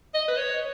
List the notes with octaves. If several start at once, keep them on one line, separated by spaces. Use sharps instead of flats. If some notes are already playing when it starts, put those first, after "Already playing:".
D#5
B4
C#5